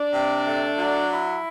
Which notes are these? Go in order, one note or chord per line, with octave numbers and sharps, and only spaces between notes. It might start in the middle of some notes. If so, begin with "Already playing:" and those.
Already playing: D4 D5
C3
A3
F#3
E4